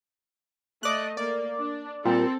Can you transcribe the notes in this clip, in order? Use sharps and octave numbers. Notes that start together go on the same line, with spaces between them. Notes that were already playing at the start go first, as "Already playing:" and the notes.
A3 D5 D#5 F#6
A#3 D5
D4
A#2 G3 C4 A4